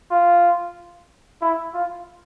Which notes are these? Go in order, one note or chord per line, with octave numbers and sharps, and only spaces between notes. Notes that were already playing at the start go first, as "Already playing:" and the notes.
F4
E4
F4